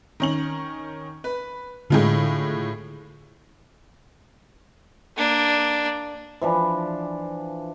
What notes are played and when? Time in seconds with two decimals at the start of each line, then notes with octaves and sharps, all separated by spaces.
0.20 D#3 C#4 F#7
1.24 B4
1.90 A2 D3 G#3 F4
5.16 A#3 D4
6.41 E3 F3 D4